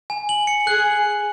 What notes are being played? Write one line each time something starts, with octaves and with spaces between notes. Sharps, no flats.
G#5
F#7
C#7
G#4 F#6